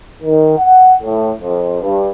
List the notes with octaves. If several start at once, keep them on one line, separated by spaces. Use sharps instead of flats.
D#3
F#5
A2
F2
G2